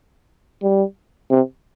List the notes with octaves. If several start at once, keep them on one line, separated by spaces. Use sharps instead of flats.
G3
C3